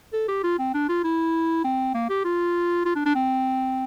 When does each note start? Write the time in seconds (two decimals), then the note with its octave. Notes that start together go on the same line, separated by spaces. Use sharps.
0.13 A4
0.28 G4
0.44 F4
0.59 C4
0.74 D4
0.89 F4
1.04 E4
1.64 C4
1.95 A#3
2.10 G4
2.25 F4
2.85 F4
2.96 D4
3.06 D4
3.15 C4